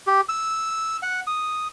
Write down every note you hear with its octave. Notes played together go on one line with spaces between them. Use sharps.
G4
E6
F#5
D#6